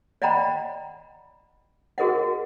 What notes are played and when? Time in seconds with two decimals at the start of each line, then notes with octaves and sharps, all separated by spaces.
0.22 D5 D#5 F#5 G5 A#5 B5
1.98 F#4 G#4 A#4 D#5 F#5